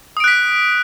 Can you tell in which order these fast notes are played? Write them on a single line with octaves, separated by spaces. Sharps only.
D#6 D7 F#6 B6